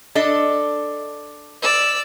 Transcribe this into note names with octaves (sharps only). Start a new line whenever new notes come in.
D4 A4 D#5
D5 E6